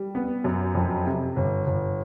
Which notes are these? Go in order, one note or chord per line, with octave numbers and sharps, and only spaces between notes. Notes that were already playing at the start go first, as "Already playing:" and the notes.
Already playing: G3
B3
F#2
F2
C3
G1
G1